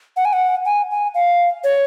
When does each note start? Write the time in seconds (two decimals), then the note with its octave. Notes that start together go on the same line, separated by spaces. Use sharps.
0.17 F#5
0.25 G#5
0.33 F#5
0.65 G#5
0.91 G#5
1.14 F5
1.64 C#5